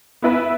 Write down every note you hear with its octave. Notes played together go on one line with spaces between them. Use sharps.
B3 E4 B4 E5